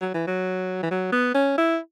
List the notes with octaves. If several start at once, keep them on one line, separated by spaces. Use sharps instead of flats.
F#3
E3
F#3
E3
F#3
B3
C#4
E4